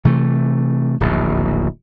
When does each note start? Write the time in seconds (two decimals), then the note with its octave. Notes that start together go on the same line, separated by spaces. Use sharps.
0.05 C3 E3 A3
1.00 D1 A#1 D#2